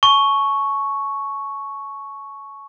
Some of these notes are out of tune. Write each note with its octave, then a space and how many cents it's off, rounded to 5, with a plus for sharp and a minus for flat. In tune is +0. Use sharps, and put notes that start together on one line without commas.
A5 -40 C#6 +0